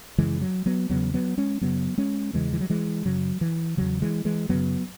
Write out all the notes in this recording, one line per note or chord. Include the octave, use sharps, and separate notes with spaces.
F#2 C#3 E3 G#3
F#3
F#3 B3
E2 C#3 F#3 B3
F#3 B3
G#3 C#4
F#2 C#3 F#3 B3
G#3 C#4
E2 C#3 E3 G#3
E3
F#3
E3 G#3
F#2 C#3 F#3
E3
E2 C#3 F#3
E3 G#3
E3 G#3
F#2 C#3 F#3 B3